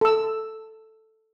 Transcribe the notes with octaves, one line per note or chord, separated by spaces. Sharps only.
A4 E6